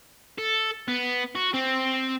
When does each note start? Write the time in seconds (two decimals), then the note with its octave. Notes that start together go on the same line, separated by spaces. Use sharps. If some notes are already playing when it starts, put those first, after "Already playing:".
0.38 A4
0.88 B3
1.35 F#4
1.54 C4